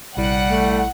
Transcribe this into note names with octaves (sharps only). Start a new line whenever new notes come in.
A#1 C3 G3 E4 F#5
A3